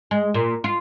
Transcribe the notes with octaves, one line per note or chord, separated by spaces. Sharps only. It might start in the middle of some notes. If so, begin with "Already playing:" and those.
G#3
A#2
F4